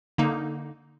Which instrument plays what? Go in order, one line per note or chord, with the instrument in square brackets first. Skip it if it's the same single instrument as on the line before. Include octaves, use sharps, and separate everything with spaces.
[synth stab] D3 A#3 D#4